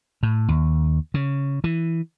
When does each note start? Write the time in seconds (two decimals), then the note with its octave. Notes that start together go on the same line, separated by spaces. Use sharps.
0.23 A2
0.48 D#2
1.14 C#3
1.64 E3